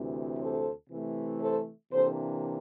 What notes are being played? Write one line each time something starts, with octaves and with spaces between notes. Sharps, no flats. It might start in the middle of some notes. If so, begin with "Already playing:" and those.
Already playing: D2 C3 E3
A4 C5
C3 E3 A3
A4 C5
C3 E3 A#3 D4 A4 C5